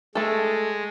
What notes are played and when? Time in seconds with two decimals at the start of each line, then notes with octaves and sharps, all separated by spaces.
0.15 G#3 A3 A4